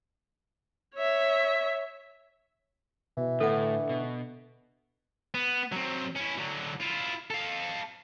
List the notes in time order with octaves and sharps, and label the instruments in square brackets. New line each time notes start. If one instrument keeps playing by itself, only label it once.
[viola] C#5 E5
[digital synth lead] B2 [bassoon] E3
[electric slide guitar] A2 [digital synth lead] D3 [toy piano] A4 F#5
[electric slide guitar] B2
[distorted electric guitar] B3
F#3 C4
C#4 E4
D3 F#3
E4 F4
A4 F5